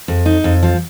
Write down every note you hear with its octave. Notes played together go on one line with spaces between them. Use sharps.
F2
D#4
F2
F3